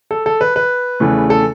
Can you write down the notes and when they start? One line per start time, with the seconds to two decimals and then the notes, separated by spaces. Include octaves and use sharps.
0.11 A4
0.26 A4
0.41 B4
0.56 B4
1.00 E2 C#3 E3 A3
1.30 A4